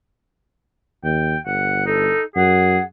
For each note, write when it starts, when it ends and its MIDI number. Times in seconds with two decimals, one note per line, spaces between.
1.04 1.35 39
1.04 1.39 79
1.46 2.09 31
1.46 1.84 78
1.86 2.22 63
1.86 2.24 69
2.36 2.77 42
2.36 2.80 68
2.36 2.84 78